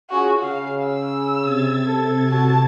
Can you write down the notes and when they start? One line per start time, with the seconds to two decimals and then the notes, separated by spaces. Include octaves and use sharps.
0.10 C#4 F4 F#4 G#4
0.43 C#3 F5
0.86 E6
1.41 C3 G#6 A6
1.86 A4
2.28 A1 F#4 A4 A5